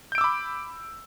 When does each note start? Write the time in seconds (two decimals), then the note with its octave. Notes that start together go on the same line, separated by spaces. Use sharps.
0.12 G6
0.15 D7
0.18 E6
0.21 D6
0.24 B5